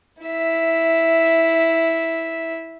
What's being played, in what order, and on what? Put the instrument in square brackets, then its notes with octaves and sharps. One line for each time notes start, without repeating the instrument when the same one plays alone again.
[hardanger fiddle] E4 E5